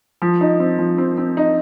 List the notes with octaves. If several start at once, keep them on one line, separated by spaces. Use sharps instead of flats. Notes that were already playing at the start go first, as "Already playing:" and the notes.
F3
D#4
C4
F3
C4
C4
D#4